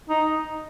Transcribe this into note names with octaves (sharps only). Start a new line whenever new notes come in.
D#4